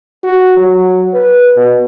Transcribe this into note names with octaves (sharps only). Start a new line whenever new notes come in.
F#4
F#3
B4
B2